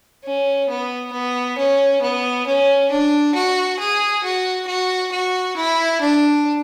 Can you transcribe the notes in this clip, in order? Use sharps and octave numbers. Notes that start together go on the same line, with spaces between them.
C#4
B3
B3
C#4
B3
C#4
D4
F#4
G#4
F#4
F#4
F#4
E4
D4